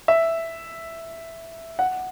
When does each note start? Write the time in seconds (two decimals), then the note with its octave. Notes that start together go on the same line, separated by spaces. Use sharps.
0.08 E5
1.79 F#5